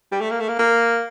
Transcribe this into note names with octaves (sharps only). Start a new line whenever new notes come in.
G3
A3
A#3
A3
A#3
A#3